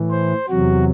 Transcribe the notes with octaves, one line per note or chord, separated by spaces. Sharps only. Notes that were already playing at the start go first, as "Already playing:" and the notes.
Already playing: A2 E3
C5
E2 C3 F#3 F#4